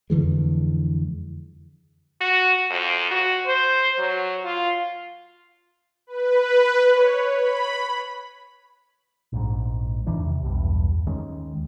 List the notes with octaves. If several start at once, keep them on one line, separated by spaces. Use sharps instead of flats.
F2 D3 E3 G#3
F#4
F2
F#4
C5
F#3
F4
B4
C#5
B5
A#1 G#2
E2 D#3 E3 D4
C3
B1 E2 G2
D#2 D#3 G#3 C#4